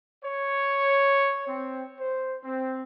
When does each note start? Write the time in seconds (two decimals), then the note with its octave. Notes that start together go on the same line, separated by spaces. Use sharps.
0.25 C#5
1.48 C4
2.00 C5
2.44 C4